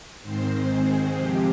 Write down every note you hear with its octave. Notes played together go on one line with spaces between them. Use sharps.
G#2 D#3 G#3 C4 C5
G#4
C3 F3 G#3 C4 G4